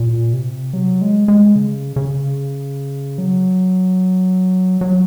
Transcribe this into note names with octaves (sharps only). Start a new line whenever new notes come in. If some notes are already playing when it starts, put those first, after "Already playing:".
Already playing: A#2
C3
F#3
G#3
G#3
C#3
C#3
F#3
F#3